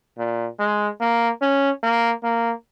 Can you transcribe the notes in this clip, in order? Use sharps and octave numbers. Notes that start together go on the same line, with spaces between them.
A#2
G#3
A#3
C#4
A#3
A#3